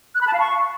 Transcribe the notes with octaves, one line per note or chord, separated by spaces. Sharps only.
F#6
B5
A5
F5
C#6